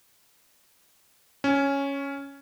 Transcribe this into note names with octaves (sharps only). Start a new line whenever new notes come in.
C#4